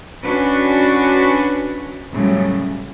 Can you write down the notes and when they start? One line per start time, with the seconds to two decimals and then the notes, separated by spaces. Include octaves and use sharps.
0.23 C#4 D4 F#4 B4
2.13 A2 C#3 F#3 G3